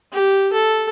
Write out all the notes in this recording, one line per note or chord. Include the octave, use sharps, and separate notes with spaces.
G4
A4